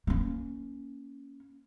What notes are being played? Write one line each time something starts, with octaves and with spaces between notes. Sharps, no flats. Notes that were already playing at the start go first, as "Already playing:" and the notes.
A#3 C#4